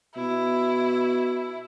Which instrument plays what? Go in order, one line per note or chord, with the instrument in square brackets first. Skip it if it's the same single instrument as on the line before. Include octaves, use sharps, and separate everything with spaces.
[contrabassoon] B2 [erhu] E4